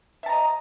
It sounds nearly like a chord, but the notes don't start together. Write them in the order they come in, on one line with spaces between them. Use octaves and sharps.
E5 A5 A#5 D#5